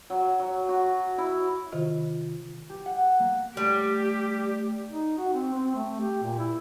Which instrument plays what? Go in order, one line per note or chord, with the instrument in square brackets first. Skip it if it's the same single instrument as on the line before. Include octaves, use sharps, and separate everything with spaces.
[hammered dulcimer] F#3
F#3
F#4
E4
[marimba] C3 D#3 F4
[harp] G4
F#5
A#3
[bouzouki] G3 [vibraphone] A3 D5 [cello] G4
[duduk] D#4
F#4
C4
C4
A3
G4
A#2
E4